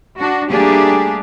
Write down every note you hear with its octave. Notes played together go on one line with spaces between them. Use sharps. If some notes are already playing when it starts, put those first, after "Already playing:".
D4 F#4
G3 A3 A#3 D4 G4 G#4